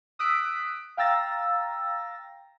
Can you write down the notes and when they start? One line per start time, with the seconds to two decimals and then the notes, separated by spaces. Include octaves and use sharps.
0.19 D#6 E6 F#6 B6 D7
0.97 F5 G5 A#5 E6 A6 A#6